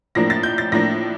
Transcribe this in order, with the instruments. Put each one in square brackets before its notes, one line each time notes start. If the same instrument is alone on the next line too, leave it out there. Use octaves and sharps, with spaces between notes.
[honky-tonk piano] A2 F3 A#3 D4 A#6
A6
G6
A6
A2 F3 A#3 D4 A#6